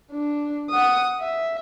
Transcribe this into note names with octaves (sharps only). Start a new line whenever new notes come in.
D4
F#5 D#6
E5